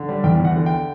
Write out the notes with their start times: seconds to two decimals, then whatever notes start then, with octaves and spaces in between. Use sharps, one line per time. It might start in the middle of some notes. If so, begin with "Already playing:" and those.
Already playing: D3
0.09 G3
0.24 E2 G5
0.40 E2 F#5
0.55 D3
0.66 G5